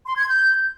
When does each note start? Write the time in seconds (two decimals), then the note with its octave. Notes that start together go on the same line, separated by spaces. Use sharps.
0.06 C6
0.17 G#6
0.28 G6